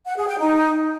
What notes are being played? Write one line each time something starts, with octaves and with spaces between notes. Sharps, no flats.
F#5
G#4
G5
D#4